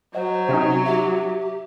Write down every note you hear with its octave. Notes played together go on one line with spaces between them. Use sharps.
F#3 C5 D#5 F#5
C3 C#4 D#4
G4 E5